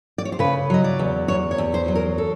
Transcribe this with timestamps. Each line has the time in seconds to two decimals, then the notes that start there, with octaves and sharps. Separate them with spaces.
0.18 D5
0.25 C#5
0.32 C5
0.39 C#3 B4
0.70 F#3 D#5
0.84 D5
0.99 E2
1.28 E2 C#5
1.51 C#5
1.58 E2
1.74 C5
1.88 F#3
1.95 A#4
2.18 A4